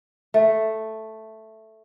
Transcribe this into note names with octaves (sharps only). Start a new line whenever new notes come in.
A3